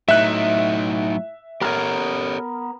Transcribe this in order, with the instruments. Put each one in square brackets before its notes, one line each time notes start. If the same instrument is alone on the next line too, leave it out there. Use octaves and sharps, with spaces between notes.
[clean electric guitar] A2 [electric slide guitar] F#3 D#4 [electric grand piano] E5 F#6
[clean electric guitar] B3 A#4 [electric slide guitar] G4 A4 C#5